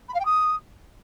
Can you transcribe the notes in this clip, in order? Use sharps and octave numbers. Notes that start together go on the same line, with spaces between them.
B5
F5
G5
D#6